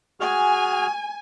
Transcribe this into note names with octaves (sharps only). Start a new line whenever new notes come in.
F#4 G#4 G#5 F6